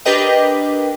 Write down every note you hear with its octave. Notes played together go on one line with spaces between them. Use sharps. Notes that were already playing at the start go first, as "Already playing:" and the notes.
D4 G4 A#4 B4 D#5 G5